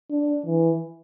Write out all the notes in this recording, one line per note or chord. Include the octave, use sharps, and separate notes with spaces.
D4
E3